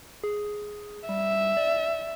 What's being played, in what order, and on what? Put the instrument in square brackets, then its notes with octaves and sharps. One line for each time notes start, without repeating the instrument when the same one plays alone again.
[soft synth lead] G#4
[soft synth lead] G3 [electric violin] E5
[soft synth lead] D5